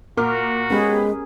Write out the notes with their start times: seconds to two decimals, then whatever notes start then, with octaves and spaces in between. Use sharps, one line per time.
0.17 A#2 F#4 A#4 D6 F6
0.70 G#3 B3 C#4 G4 G#4 B5